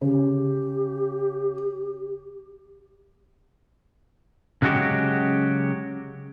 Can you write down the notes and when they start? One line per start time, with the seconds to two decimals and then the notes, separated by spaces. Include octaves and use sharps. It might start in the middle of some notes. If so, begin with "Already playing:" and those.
0.01 C#3 G4
4.62 C#3 F#3 G#3 F#4 G4